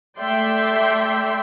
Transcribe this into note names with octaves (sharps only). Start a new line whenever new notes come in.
A3 D5 E5 G5 C6